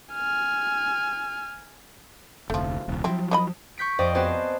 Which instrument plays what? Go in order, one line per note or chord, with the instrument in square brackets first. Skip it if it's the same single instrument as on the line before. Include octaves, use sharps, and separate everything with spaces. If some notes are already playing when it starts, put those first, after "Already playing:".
[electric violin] G#5 F6
[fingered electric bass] F1 D2 [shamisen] F3 A3
[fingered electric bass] D#1 C2
[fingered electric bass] F3 F#3 [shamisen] C4 E4
[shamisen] D#3 D#5 B5
[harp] C#6 G6 B6 D7
F2 C5 D5 D#5 G5
B3 C4 F#4 G#4 C5 A5